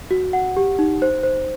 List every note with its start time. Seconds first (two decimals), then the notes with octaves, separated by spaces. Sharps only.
0.11 F#4
0.33 F#5
0.57 G4
0.79 D#4
1.02 C5
1.23 C5